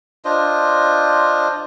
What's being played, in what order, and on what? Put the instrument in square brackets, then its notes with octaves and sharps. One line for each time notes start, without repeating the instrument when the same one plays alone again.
[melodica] D4 F4 C5 D#5